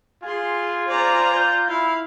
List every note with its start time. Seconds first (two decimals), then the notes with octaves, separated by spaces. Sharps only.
0.24 F4 G#4 G#5 C6
0.88 C5 D5 A#5
1.33 G6
1.68 E4 F5